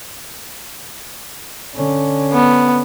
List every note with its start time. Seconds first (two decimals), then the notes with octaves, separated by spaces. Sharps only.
1.75 D3 C#4
2.33 B3